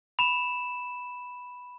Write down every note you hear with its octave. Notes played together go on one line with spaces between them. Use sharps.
B5 E7